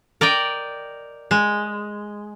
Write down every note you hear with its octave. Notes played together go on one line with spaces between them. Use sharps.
A#4 D5 D#5 G5
G#3